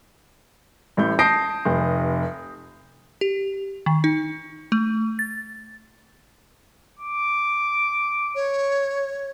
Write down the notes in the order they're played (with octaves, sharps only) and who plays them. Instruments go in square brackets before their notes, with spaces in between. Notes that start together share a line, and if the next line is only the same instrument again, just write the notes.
[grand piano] A1 A2 G6
A5 D#6 G6 A#6 C7 D7
F1
[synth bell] G4
D#3
D#4
A3
A6
[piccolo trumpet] D6
[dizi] C#5